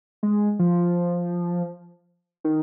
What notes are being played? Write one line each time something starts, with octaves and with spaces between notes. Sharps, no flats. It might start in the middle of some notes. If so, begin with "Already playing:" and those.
G#3
F3
D#3